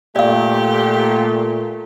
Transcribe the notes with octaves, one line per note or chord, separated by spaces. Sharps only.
A#2 A3 G4 D5 F5